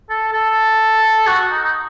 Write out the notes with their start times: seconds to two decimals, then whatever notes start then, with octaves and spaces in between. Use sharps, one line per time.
0.10 A4
0.33 A4
1.27 F#4
1.51 D#4
1.63 D#4